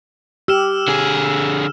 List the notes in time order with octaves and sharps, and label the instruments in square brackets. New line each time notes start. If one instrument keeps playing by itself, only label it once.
[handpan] G4 [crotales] E6 F6 E7
[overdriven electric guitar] D3 G#4